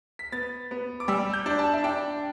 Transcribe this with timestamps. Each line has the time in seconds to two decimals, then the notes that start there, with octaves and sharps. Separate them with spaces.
0.19 B6
0.32 B3 A6
0.71 B3
1.00 D6
1.08 G3 E6
1.33 G6
1.46 D4
1.59 A5
1.73 E5
1.84 D4 G5